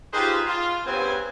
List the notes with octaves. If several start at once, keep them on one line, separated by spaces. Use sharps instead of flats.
D#4 F4 G4 G#4 B4 C5
F4
G2 C#3 B3 C4 G#5